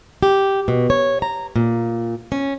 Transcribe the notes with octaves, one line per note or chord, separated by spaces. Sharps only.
G4
B2
C#5
A#5
A#2
C#4